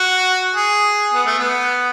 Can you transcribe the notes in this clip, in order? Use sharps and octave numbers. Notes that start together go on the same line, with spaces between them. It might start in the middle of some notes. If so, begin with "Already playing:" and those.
Already playing: F#4
G#4
B3
A3
B3